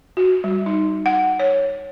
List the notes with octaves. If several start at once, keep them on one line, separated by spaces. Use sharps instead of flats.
F#4
G3
D#4
F#5
C#5